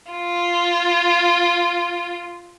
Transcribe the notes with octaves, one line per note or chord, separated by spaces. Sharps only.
F4